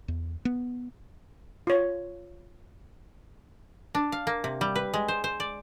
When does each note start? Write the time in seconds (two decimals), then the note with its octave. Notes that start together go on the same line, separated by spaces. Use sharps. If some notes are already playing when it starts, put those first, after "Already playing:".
0.08 E2
0.45 B3
1.67 F4 C#5
3.95 D4
4.12 F5
4.27 A#3
4.44 C3
4.61 G3
4.76 B4
4.94 G#3
5.08 C5
5.24 C5
5.40 D5